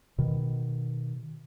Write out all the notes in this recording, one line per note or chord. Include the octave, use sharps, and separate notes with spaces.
B2 D#3